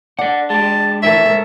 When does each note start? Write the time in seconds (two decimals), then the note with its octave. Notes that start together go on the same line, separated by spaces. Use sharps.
0.19 D4 D5 F#5
0.50 G#3 G4 A5
1.03 D2 D#3 E3 A4 A#4 C#5 E5
1.26 G#2 A4 A#4